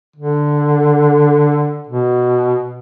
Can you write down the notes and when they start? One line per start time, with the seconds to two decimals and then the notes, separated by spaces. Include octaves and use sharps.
0.16 D3
1.87 B2